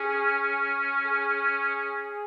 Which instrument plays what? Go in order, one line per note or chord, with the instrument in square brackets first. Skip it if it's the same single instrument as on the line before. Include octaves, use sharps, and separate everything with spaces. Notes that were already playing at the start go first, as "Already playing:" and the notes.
Already playing: [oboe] C#4 [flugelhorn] G#4
[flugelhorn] G#4